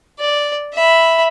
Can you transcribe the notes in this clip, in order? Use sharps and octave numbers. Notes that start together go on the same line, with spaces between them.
D5
E5 B5